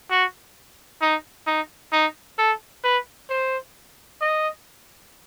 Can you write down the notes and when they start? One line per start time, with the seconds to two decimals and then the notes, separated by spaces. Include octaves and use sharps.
0.11 F#4
1.01 D#4
1.47 D#4
1.93 D#4
2.38 A4
2.84 B4
3.30 C5
4.21 D#5